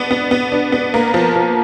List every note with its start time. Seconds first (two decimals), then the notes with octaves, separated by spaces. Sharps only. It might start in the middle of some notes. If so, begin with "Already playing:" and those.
Already playing: B3 D4
0.11 B3
0.31 B3
0.52 D4
0.72 B3
0.94 A#3
1.14 F3
1.36 F3